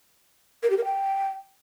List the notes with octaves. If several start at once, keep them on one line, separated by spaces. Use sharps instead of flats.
A#4
G4
A#4
G5